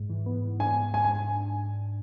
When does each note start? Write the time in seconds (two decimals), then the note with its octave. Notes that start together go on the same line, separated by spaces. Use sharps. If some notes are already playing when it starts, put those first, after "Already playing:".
Already playing: G#2
0.10 E3
0.26 B3
0.44 G#2
0.59 D4 G#5
0.77 G#2
0.93 G#2 G#5
1.04 G#5